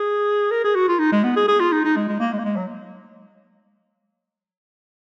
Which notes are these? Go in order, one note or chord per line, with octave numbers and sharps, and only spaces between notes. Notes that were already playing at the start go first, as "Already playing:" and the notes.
Already playing: G#4
A#4
G#4
F#4
F4
D#4
G#3
B3
G#4
G#4
F4
D#4
D#4
G#3
G#3
A#3
G#3
A#3
G#3
F#3